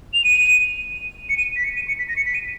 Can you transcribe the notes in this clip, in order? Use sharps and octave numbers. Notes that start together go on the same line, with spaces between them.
F7
D#7
C#7
D#7
B6
C#7
D#7
C#7
B6
A#6
C#7
B6
D#7